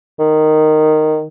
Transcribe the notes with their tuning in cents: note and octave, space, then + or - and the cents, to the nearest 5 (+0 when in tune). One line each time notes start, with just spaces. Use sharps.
D#3 -10